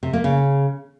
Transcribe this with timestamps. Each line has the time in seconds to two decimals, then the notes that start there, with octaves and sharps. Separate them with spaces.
0.03 C3
0.13 A#3
0.24 C#3